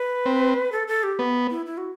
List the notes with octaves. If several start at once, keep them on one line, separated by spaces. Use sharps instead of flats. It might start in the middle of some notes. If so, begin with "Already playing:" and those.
Already playing: B4
C4
A4
A4
G4
B3
E4
E4
F#4